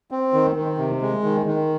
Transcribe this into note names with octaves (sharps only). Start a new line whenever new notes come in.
C4
D#3
D#3
C3
G#3
D#3
D#3